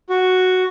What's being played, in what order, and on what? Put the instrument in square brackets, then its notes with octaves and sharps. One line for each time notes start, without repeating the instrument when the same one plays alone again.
[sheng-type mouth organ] F#4